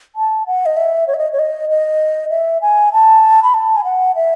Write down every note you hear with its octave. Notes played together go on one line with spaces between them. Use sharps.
A5
F#5
D#5
E5
C#5
E5
D#5
C#5
D#5
D#5
E5
G#5
A5
B5
A5
G#5
F#5
E5